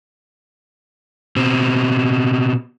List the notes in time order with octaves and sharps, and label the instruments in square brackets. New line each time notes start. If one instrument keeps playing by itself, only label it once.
[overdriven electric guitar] B2 C4